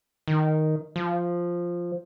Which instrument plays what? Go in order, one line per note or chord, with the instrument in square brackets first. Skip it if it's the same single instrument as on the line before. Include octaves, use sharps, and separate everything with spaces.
[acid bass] D#3
F3